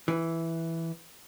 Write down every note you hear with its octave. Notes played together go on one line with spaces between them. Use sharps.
E3